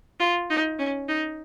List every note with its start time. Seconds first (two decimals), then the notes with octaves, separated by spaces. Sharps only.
0.20 F4
0.50 D#4
0.79 C#4
1.08 D#4